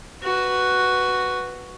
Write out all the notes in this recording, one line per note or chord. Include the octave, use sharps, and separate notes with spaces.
F#4 B4